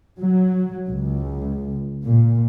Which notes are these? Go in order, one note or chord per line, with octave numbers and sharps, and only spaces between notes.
F#3
C#2
A#2